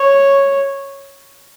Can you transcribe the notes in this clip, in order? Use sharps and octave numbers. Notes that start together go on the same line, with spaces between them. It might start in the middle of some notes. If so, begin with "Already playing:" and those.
Already playing: C#5